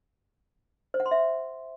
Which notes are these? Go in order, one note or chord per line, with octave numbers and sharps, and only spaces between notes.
C5
F#5
C6
E5